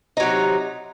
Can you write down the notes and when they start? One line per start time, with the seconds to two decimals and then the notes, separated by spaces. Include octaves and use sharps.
0.17 D#4
0.20 F#3
0.23 C3